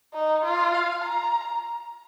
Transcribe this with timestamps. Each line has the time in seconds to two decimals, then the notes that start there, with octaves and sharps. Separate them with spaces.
0.14 D#4
0.45 F4
0.74 F5
1.04 A#5